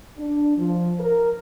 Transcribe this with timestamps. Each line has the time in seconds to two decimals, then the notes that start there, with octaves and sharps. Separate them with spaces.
0.18 D4
0.58 F3
1.00 A#4